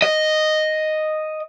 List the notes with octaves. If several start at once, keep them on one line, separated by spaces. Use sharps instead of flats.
D#5